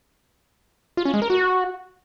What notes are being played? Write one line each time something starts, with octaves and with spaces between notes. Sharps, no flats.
F4
C#4
G#3
A#4
F#4